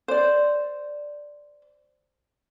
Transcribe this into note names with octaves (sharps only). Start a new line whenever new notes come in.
C5 D5